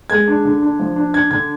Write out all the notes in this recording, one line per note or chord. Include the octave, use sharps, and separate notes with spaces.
G#3 G#6
D4
D3
D4
F3
D4
D4 G#6
D3 G#6